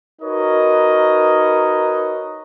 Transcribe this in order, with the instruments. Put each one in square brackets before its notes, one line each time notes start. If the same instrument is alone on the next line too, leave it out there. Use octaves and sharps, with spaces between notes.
[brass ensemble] D#4 F#4 A#4 B4 C#5 D#5